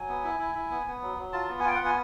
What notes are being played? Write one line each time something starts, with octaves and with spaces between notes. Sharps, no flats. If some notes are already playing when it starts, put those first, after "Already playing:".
Already playing: F#3 G#5
B3
E4
E4
E4
B3
B3
F#3
F#3
F4 A5
B3
G#5
F4 G5
F#5
B3
G#5